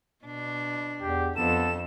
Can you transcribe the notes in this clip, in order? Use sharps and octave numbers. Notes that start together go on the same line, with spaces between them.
B2 D4
E2 G4
F2 B3 A4 E7